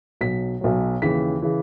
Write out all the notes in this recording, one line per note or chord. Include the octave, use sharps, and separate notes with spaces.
B1 B2 F#3 B6
B1 B2 F#3
D#2 C#3 E3 B6
C#3 E3